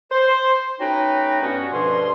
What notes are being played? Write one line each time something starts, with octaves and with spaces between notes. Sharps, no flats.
C5
A3 C#4 D#4 F#4 B4 G5
G2 B3 C#4 F#4
D2 G2 B2 F3 G#4 C6